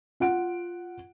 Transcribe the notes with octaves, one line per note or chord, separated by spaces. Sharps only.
F4 F#5 D7